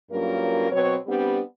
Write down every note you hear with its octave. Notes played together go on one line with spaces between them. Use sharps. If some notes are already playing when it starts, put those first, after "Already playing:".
G2 F#3 A#3 C#4 F4 A#4
B2 F#3 C4 B4 C#5
G3 B3 C4 D4 G4